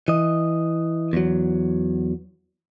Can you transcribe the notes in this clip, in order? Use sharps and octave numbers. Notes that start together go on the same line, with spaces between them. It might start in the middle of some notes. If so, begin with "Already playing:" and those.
E3 D#5
E2 F#3